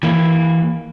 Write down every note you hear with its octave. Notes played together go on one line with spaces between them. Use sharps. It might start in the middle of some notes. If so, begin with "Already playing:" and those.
E3 A#3